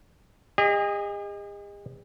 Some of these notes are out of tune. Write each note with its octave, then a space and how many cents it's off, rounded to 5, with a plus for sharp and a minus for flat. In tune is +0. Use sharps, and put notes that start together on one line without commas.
G#4 -45 D#5 -5